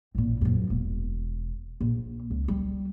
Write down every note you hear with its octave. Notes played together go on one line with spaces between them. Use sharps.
A1 A#2
A#1 F#2
E1
A#1
C#2
G3